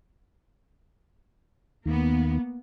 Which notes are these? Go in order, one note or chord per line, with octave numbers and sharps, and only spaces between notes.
D#2 D#3 A#3 B3